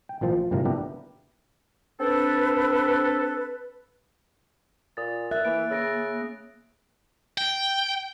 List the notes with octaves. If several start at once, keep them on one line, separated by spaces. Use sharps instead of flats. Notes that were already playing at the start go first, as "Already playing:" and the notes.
G5
A1 A#2 F3 C5 A5
F3
G1 A2 C3 F3 F#3 A#4
B3 D4 E4 G4 A#4 B4
C4 D4 A4 B4
A#2 D#6 A6
A#4 E5 F#6 A6
E3 A#3 D7
C#3 E6 A#6 D7
G5